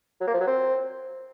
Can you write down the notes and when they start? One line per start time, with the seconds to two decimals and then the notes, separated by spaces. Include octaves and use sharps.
0.21 F#3
0.27 A#3
0.34 F3
0.40 F#3
0.47 C4